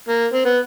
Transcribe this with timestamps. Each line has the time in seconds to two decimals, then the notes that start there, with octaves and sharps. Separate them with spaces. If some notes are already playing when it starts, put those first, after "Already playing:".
0.08 A#3
0.33 C4
0.45 B3